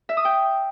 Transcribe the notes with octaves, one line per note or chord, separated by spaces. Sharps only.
E5
D#6
G5